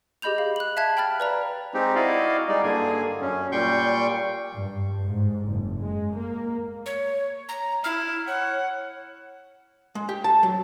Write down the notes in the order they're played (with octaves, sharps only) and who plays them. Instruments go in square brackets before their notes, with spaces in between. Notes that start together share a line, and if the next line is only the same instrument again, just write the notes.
[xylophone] G4 G#4 D#5 B5 G6 F7
F5
F#6 F#7
E5 F5 A5 F#6 G#6 B6
G5 B5 F6 A6
B4 D5 A#5
[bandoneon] G#3 C4 D#4 G4
E4 F#4 D5 D#5 F5
G3 G#3 D#4 D5
G2 D3 A#3 G#4 G#5
F#2 C#4
A#2 G3 G5 C6 C#6 G6
[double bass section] G2
G#2
F#1
G#3
A#3
[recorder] C#5
A#5
[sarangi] E4 [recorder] F6
[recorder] C#5 [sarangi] F#5
[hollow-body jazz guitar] G#3
G4
A5
F#3